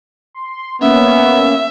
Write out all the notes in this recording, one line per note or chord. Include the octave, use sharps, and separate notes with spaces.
C6
A#3 B3 C#4 E5